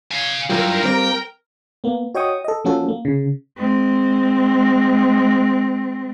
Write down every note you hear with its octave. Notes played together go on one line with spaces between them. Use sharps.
F5 G#5
C2 G2 F#3 E4 F4 A#4 G5
G3 A#3 C4 F5 G5
A#3 B3
F#4 C#5 D#5 G5 C#6 D#6
A4 D#5
F3 A#3 C#4 F#4 A4
A#3
C#3
G#3 C4